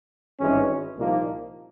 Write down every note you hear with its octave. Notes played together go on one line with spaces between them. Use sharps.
G#1 G2 E3 G#3 C#4
C2 A#2 F3 A#3 D#4